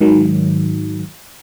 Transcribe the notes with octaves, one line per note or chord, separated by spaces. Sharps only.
G#2 D#3 F#3